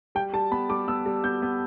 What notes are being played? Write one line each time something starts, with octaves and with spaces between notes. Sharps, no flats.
G3 G5
G3 A5
B3 B5
G3 D6
B3 E6
G3
B3 G6
B3